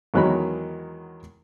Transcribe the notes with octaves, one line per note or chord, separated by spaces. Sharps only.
E2 D#3 F#3 G#3 A#4 B5